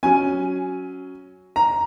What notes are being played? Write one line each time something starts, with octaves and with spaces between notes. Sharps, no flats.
F#3 C#4 G#5
A#5